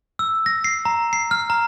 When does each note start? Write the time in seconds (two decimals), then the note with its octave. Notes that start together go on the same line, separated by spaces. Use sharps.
0.19 E6
0.46 A#6
0.64 C7
0.85 A#5
1.13 C7
1.31 F6
1.50 A#5